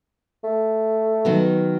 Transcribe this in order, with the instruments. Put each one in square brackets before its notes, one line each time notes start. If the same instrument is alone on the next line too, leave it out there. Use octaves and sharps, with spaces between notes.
[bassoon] A3
[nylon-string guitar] D#3 F#3 B3